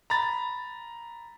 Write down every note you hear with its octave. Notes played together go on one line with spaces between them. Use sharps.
A#5 B5 A6